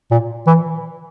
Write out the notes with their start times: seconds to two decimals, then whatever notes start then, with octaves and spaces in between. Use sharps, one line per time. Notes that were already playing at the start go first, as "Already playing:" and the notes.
0.11 A#2
0.47 E3